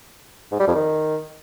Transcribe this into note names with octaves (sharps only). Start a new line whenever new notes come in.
G#2
G3
F2
D#3